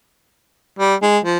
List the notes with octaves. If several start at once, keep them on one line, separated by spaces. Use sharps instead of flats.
G3
G#3
F3